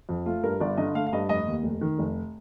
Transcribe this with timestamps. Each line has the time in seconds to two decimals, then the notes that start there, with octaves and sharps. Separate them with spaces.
0.09 F2
0.26 A3 F4
0.43 G2 A#4
0.61 G1 D5
0.77 D3 D#5
0.95 A3 F5
1.07 F5
1.13 G2 D#5
1.29 F1 D#5
1.47 D#2
1.63 F1
1.81 D#3
1.99 F1